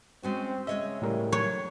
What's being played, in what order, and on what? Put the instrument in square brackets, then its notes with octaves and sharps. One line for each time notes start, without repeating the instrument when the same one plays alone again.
[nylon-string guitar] G#3 C#4 F#4 [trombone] C4
[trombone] C#3 [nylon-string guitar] G#3 C#5 D#5 [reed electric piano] E5
[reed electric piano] A2 G3 A#4
[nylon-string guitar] F#3 [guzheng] C#5